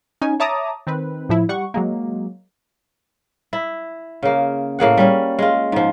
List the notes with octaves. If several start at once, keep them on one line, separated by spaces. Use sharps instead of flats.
C#4 D#4 G#5
C#5 E5 A5 A#5 D6 D#6
D#3 C4 B4
A2 F3 E4
G3 F#5 C#6
F#3 G#3 A#3
E4
C#3 A#3
A2 A#3 G#4 F#5
G3 C#4
G#3 F4
G#2 F3